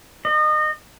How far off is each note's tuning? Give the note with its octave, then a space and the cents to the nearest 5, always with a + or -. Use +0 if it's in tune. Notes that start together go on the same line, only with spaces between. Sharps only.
D#5 -30